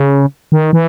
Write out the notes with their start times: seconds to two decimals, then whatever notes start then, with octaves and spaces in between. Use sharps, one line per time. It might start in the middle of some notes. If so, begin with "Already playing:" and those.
Already playing: C#3
0.52 D#3
0.73 E3